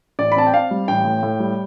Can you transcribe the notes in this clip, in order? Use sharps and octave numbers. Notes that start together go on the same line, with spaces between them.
A1 D5
B5
C4 A5
G5
C4 F5
G3
A1 G5
A2
A2
G3